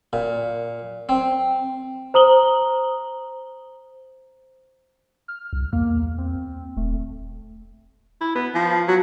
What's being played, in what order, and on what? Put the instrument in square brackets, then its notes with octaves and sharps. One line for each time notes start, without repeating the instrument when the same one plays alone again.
[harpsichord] A#2
C4
[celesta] C5 A#5 D#6 F#7 G7
[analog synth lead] F6
[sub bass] C2
[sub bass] E2 [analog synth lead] A#3
[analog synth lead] C4
[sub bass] D#1 [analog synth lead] A3
[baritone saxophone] E4
B3
F3
F#3